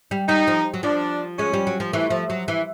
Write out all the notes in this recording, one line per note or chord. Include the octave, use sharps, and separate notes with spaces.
G3
G3 D#4
F3
F#3
F3 D4
G#3 C#4
G3
F#3
F3
E3 A3
F3
F#3
E3